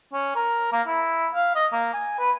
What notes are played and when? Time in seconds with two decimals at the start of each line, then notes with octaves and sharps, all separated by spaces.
0.13 C#4
0.36 A#4
0.73 A#3
0.88 E4
1.35 F5
1.56 D#5
1.72 A#3
1.94 G#5
2.19 B4